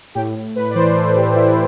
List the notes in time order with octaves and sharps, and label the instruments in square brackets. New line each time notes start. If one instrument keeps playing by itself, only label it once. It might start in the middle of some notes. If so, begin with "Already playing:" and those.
[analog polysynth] A2 G4
A2
A2 B4
D5
E3 C5
E3 A4
E3 G4
A2 E4